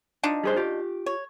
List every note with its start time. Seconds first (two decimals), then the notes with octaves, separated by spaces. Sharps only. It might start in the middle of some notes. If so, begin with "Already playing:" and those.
0.23 F3 D4 D#4
0.43 G3 G#4 C5
0.56 F4 G4
1.06 C#5